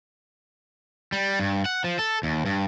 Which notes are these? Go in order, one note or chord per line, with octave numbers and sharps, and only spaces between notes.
G3
G2
F#5
F3
A4
D#2
G2